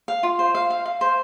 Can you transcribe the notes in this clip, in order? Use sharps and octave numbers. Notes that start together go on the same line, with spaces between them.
F5
F4
C5
F5
F5
F5
C5